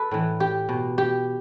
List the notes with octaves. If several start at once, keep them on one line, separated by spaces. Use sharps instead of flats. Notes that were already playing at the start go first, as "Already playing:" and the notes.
Already playing: A4 B4
A2 E3
G4
B2
G4